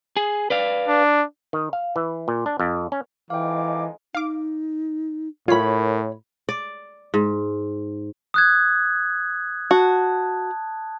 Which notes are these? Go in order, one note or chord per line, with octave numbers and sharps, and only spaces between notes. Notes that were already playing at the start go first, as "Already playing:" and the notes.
G#4
B4 D5 F5
D4
D#3
F5
E3
A#2
D4
F2
C#4
F2 E3 G#3 D#4 F5 G5 D6
D#4 F5 D6
A2 F4 A#4 C#5 B5 B6
D5
G#2
D#6 F#6 G#6
F#4 A5